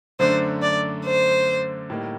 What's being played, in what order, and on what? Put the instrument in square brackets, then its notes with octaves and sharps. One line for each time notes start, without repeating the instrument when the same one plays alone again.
[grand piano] F#2 D3 A3 D4 [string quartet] C5
[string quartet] D5
C5
[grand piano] A2 G3 A#3 D#4